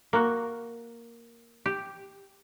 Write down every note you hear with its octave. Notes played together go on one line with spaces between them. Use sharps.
A#3 F#4
G4